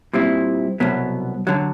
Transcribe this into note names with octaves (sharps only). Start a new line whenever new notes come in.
A#2 G3 C4 E4
C2 B2 F#3 B3
D3 F#3